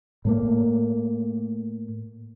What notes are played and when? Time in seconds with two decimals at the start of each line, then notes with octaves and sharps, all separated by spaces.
0.25 A2 A3 A#3